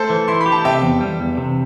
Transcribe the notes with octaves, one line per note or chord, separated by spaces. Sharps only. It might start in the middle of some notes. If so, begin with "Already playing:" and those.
Already playing: A3 A4 C5
E3
E4 C6
B5
G4
A5
C3 E5 G5
E2
G3
E2
C3